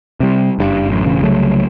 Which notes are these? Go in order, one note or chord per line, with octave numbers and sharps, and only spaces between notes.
C3 G3
F#1 G2
A1 F#2
E1 A1 C#3
C2 C#3 F#3 A3